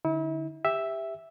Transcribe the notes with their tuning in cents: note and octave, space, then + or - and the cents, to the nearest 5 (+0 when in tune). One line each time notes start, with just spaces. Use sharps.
D3 +0 E4 -40
G4 +20 E5 +0